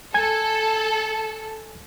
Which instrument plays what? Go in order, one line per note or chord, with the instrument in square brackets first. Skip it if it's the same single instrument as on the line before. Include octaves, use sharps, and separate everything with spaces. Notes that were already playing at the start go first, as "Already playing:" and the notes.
[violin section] A4 [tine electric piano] G#5 G#6